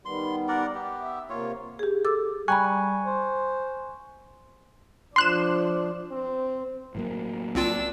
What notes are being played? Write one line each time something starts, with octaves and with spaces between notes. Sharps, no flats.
D#3 G3 B3 C6
A#4 D5 F#5
B3 G4
E5
C3 A#3 F4 C#5
G4 G#4
A4 D6 E6
G3 G5 G#5 A#5 B5 C#6 F#6
C5
F3 D4 C6 F#6 E7
C4
A2 F#3 A#3
C2 C4 D4 F4 E6